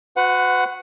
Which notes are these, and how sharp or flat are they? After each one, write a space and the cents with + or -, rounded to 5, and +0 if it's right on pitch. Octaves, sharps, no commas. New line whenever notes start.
F#4 -25 B4 +40 F#5 +0